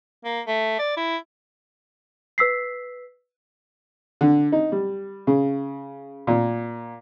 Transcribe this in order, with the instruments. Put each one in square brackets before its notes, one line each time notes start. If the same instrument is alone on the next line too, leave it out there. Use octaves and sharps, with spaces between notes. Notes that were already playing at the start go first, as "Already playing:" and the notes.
[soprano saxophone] A#3
A3
D5
E4
[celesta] B4 E6 B6 C7
[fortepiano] D3
D#4
G3
C#3
A#2